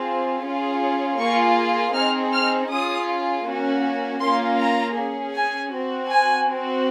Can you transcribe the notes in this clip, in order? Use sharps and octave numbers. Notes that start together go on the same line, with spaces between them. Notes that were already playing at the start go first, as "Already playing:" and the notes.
Already playing: C4 F4 G#4
C#4 F4 G#4
A#3 F4 G#4 C#6
C4 D#4 G#4 F6
F6
C#4 F4 G#4 D#6
A#3 C#4 F#4
A#3 C#4 F4 C6
A#5
C#4 G#4
G#5
C4 F#4
G#5
C4 F#4